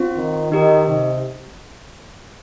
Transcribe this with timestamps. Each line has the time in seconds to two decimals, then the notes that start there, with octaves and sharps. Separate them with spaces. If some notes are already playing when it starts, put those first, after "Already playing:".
Already playing: C4 F4 C5
0.17 D#3
0.51 D#3 D#4 G4 D#5
0.87 C3